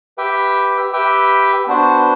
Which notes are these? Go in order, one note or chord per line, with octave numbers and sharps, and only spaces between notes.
G4 B4 E5 G5
G4 B4 E5 G5
B3 D4 F#4 C5